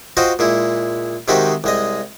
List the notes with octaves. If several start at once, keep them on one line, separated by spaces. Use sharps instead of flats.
F4 F#4 C5 D#5 F5 G5
A#2 G#3 E4
C3 D#3 G#3 C4 F#4 G4
C2 G#3 D#5